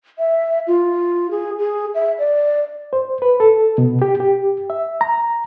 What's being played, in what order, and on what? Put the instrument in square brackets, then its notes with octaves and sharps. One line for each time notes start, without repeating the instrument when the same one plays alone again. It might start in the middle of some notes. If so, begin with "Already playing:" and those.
[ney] E5
F4
G#4
G#4
E5
D5
[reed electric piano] C5
B4
A4
B2
G4
G4
E5
A#5